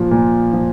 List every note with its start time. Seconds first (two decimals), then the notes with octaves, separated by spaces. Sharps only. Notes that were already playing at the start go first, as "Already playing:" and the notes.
Already playing: A#2 F3
0.11 A#2
0.53 F3